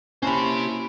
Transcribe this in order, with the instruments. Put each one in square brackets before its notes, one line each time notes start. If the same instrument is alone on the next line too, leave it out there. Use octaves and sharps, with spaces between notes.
[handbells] A#3 E4 A5 [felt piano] C#4 B5 [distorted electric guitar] G4 C5